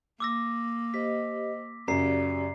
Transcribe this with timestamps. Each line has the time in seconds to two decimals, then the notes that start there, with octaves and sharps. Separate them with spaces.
0.20 A#3 D6 E6 A#6
0.94 G4 C5 D#5 B6
1.88 F#2 C#3 G4 D5 A#5 C7